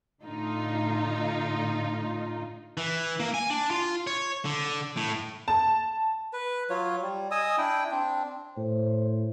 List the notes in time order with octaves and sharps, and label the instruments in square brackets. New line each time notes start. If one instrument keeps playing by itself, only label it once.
[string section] A2 D3 D#4 F4
[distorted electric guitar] E3
A#3
G#5
D4
F4
C#5
D3
A2
[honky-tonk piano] A5
[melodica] B4
F#3 F4 C#5
G3
D#5 G#5 D#6 E6
D4 E4 G5
C4 D4
[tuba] A2 [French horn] C5